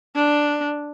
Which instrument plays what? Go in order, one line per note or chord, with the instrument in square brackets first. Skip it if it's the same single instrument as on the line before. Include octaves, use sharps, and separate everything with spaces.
[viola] D4